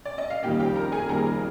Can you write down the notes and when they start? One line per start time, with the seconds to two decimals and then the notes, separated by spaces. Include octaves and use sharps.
0.05 D5
0.18 D#5
0.30 F5
0.43 F2 D#3 G3 A#3 G4 G5
0.60 G4 G5
0.76 A#4 A#5
0.92 G#4 G#5
1.09 F2 D#3 G3 A#3 A#4 A#5